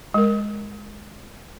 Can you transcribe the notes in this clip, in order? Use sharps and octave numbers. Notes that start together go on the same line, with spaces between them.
G#3 A#4